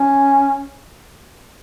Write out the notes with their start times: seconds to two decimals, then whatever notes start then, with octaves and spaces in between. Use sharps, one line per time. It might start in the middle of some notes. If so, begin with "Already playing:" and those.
Already playing: C#4